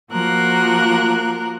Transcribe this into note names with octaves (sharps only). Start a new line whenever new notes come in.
F3 A#3 F#4 A#4 F#6